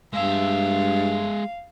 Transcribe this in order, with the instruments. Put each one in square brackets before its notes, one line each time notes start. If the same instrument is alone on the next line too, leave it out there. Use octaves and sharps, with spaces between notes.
[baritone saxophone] G2 [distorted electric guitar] G#3 E5 [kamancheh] F5